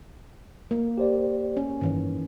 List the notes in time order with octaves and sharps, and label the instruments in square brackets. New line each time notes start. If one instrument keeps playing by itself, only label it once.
[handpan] A#3
[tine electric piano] G4 C5 D5
[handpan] C#4
[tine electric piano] G2 [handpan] D#3 E3 C#4